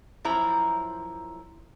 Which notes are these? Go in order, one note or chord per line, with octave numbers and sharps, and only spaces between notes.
F#2 F3 E4 C5 A#5